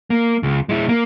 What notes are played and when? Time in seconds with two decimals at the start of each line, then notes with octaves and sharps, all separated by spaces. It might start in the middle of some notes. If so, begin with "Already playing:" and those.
0.10 A#3
0.43 C#2
0.69 G#3 E4
0.89 A#3